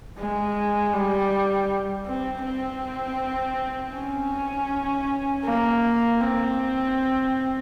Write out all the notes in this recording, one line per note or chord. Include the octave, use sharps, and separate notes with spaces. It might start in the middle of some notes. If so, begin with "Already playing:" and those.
G#3
G3
C4
C4
C#4
A#3
C4